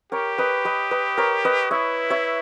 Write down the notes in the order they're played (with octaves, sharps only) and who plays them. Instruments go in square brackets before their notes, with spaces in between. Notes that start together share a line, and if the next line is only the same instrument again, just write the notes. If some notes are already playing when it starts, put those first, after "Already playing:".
[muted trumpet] G4 [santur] A#4 C#5
[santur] B4 D#5
B4 D#5
B4 D#5
A#4 C#5
B4 D#5
[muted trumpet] E4 [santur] C#5 E5
[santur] C#5 E5